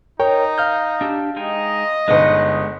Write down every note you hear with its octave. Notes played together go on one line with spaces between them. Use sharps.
D#4 A#4 C#5 G5
F5 F6 G6
D4 G4 E6
G#3 D#4 D#5 G5
G1 G#3 D#4 B4 F#5